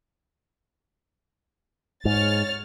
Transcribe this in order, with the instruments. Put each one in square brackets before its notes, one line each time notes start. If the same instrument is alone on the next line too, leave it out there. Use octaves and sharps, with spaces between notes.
[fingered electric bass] G#2 [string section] C#5 F6 A6